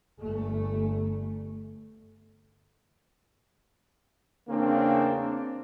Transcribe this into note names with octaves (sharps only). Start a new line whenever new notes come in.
G1 A3
E2 C#3 A#3 C4 D4